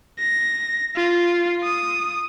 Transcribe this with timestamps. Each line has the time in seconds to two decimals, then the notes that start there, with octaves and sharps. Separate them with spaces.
0.19 A#6
0.96 F4
1.64 D#6